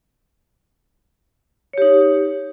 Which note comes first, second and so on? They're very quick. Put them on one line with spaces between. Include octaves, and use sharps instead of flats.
C#5 G4 D#4